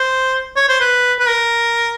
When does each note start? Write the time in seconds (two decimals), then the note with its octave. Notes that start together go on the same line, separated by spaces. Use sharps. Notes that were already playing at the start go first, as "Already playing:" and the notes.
Already playing: C5
0.56 C#5
0.69 C5
0.80 B4
1.19 B4
1.27 A#4